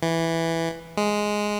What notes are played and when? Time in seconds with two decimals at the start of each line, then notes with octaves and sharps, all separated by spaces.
0.03 E3
0.97 G#3